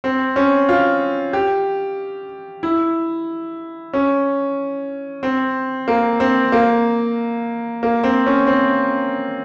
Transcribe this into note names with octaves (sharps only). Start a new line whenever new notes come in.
C4
C#4
F4
G4
E4
C#4
C4
A#3
C4
A#3
A#3
C4
C#4
C4